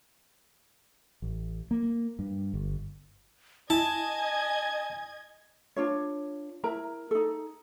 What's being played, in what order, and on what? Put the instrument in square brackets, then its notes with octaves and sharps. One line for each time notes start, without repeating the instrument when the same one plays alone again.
[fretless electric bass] A1
A#3
G2
G1
[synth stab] E4 [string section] D#5 G#6 [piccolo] G#5 [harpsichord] A5
[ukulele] D4 F4 C#5
E4 A#4 A#5
D#4 A4